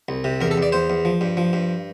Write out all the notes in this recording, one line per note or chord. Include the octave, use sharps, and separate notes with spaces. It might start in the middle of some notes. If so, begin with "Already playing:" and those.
C2
C3
E2 A#4
A4
E2 D5
E2 C5
E2
F3
G2
F3
G2